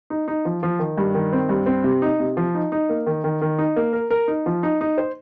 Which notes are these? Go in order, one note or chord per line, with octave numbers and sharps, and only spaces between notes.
D#4
D#4
F3
F3
D#3
G2
D#3
C4
G2
C4
C3
D#4
C3
F3
D#4
D#4
A#3
D#3
D#3
D#3
D#4
A#3
A#4
A#4
D#4
F3
D#4
D#4
C5